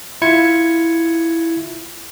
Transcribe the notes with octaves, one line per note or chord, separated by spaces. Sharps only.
E4 F4 G#6 C#7